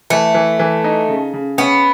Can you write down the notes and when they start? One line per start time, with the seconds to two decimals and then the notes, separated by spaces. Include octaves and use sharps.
0.10 E3 A3
0.34 E3
0.59 E3
0.84 D#4
1.09 C#3
1.33 C#3
1.58 B3 C#4